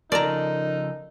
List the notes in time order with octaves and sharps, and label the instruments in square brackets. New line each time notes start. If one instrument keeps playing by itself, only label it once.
[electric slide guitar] C#3 F3 A4 [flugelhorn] D#4 [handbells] A#4 [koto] D5 A5 A#5